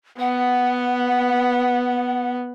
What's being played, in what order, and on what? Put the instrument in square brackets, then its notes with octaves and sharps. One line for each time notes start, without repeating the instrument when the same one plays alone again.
[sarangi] B3 [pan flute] F#5